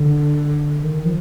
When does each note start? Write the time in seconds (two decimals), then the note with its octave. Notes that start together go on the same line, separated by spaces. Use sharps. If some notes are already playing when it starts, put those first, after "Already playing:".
Already playing: D3
0.84 D#3
1.05 F3